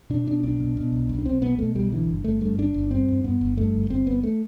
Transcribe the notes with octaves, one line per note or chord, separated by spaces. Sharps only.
B2 D4
B2 D4
B1 D4
B2
B2
B1
B1
D4
B1 C4
B2 B3
B2 A3
B1 G3
D3 E3
G1
G1 A3
G2 A3
G1 D4
G1
G2 C4
G2
G2 B3
G1
G2 A3
G1
G1 C4
G1 B3
A3